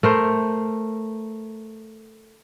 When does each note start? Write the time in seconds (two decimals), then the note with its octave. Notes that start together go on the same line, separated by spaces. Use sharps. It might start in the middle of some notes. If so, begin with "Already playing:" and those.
0.03 A3 A#4 C5